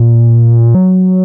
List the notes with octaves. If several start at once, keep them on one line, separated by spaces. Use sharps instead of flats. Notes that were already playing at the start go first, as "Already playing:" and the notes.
Already playing: A#2
F#3